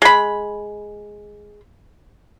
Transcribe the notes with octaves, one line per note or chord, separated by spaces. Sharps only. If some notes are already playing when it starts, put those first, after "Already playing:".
G#3 B5